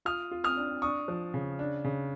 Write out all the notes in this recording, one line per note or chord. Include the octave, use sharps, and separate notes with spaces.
F4 D#6 F6
F4
D#6 F6
D4
D4 C#6 D#6
F3
C#3
D4
C#3